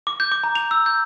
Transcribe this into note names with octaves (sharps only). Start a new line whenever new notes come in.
D6
G6
D6
A#5
F7
E6
G6